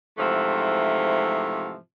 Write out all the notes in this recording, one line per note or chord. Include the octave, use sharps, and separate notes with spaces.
G#2 C3 E3 F3 A3